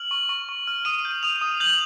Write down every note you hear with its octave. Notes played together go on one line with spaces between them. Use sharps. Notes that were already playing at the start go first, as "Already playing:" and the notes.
Already playing: F6 F#7
C#6
C#6
C#6
F6
D#6 D#7
G6
D#6 F7
D#6
G6 F#7